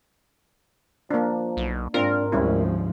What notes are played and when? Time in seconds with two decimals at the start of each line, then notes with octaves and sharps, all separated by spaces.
1.11 F3 A#3 D4
1.57 B1
1.94 G#2 C4 D4 F4 A#4
2.32 D2 G#2 C3 F3 G3 C#4 E4